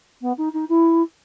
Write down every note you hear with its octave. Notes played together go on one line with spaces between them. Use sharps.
B3
D#4
D#4
E4